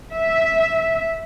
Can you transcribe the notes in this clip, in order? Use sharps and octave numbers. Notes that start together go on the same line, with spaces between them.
E5